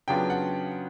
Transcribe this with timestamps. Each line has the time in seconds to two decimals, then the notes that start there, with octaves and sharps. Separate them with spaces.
0.08 C#3 F#3 B3 D4 F4 G5
0.30 F#5